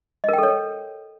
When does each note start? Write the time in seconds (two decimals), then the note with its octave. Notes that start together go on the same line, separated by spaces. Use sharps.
0.24 D#5
0.29 A#4
0.33 G5
0.38 A4
0.43 C#5